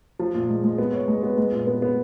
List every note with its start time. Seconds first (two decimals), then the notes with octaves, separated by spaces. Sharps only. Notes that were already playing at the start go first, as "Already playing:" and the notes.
0.19 F3
0.35 A#2
0.49 G#3
0.64 G#3
0.78 B3
0.93 C#5
1.08 G#3
1.23 B3
1.37 G#3
1.52 A#2
1.67 B3
1.82 B3